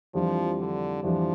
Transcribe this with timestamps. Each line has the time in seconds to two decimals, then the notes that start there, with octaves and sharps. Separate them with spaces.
0.14 F2 E3 F3 G3 D4
0.59 D3
1.03 F2 E3 F3 G3 D4